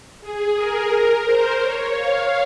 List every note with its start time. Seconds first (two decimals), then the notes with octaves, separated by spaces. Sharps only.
0.21 G#4
0.56 A#4
1.24 C5
1.57 C#5
1.92 F5